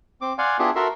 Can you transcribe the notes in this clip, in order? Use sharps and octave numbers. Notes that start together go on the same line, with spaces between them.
C4 D6
D5 F5 F#5 G#5 C6
B3 D4 E4 F4 G4 G#4
F#4 A4 A#4 E5 C6